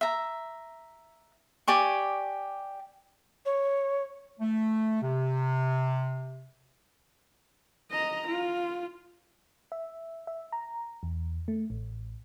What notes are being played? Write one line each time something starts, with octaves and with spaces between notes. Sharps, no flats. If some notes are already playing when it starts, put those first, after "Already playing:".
E5 A#5
G4 D5 G#5 C#6
C#5
A3
C3
D#5 A#5
F4
E5
E5
A#5
E2
A3
A1